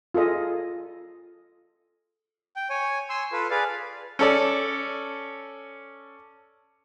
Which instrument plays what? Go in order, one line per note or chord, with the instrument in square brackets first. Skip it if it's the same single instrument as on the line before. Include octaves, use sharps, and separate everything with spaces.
[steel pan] F4 G#4 A4 D#5
[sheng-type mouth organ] G5
C#5 G#5
G#5 C6 E6
F4 A4 B4
G#4 B4 D5 F5
[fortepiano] C#4 A4 D5